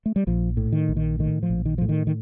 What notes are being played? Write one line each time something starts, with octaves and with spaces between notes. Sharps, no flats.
A3
G3
A#1 F3
A2
D#3
A#1
D#3
A2 D#3
F3
A#1
D#3
A2 F3
D#3
D#3